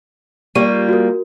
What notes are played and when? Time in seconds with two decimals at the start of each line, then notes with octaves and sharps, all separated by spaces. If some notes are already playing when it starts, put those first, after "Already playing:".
0.55 G3 A#3 F4 G4 C#6 D#7
0.89 F#4 A#4